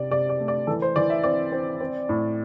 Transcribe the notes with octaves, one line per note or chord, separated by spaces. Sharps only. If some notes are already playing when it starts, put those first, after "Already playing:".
Already playing: C3 C4 D5
C3 D5
D5
A3
D5
E3 A4
C5
E3 D5
E5
C4 D5
C4
C4
A2